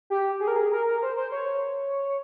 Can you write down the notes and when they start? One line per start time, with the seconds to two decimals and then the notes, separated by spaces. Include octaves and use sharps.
0.10 G4
0.40 G#4
0.48 A#4
0.56 G#4
0.71 A#4
0.87 A#4
1.02 C5
1.17 C5
1.32 C#5